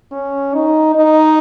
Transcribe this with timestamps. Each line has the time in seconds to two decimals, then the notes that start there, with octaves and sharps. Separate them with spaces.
0.12 C#4
0.54 D#4
0.95 D#4